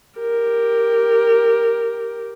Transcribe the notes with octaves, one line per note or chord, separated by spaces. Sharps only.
G4 A#4